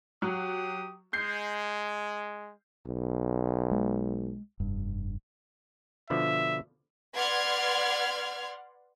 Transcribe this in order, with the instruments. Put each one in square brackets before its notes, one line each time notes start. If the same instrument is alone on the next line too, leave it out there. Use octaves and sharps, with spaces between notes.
[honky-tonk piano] F#3 [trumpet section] G4 D#6
[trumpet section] G#3 [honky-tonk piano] G6 C7
[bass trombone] B1
[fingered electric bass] G#3
F1 G2
[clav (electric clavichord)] B2 D3 F3 [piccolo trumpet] E5
[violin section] B4 D5 F#5 C6 F6 G#6